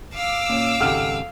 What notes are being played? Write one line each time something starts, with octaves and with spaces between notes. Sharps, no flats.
F5 D6 E6
A#2 C#4
G#1 C#2 G4 A4 F#5 F6